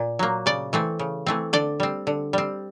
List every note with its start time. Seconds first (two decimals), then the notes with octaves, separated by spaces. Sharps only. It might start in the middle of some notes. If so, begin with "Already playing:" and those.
Already playing: A#2
0.19 F#3 A#3
0.46 C#3 D5
0.73 E3 A3 C4
0.99 C#3
1.26 E3 A3 C4
1.53 D3 D5
1.80 G3 C4
2.07 D3
2.33 G3 C4